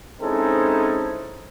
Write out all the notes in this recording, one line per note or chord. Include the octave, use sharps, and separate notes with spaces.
G#3 C4 C#4 D#4 E4 A4